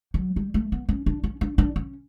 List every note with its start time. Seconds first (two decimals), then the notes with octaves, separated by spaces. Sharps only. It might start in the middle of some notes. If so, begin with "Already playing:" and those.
0.14 F#3
0.36 G3
0.54 A3
0.72 B3
0.89 C#4
1.06 D4
1.24 C#4
1.41 D4
1.58 D4
1.76 C#4